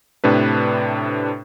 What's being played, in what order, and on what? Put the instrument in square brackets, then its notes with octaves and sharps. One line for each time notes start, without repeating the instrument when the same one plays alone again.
[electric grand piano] A2 C3 D4 B4